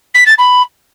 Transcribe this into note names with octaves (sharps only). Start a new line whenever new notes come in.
B6
A6
B5